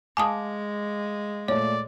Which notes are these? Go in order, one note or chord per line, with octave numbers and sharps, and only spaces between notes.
G#3 F5 G#5 A5 D6 D#6
A#2 A3 C#5 D5